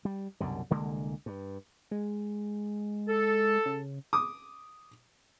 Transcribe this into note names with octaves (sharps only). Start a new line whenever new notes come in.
G3
C2 F#2 B2 D3
C2 D3 G#3 A#3
G2
G#3
A4
C#3
D6 D#6